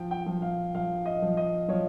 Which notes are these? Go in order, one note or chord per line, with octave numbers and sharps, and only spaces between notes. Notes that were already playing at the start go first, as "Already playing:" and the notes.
Already playing: F3 G5
G5
F3
F5
F3 F5
D#5
F3
D#5
F3 C#5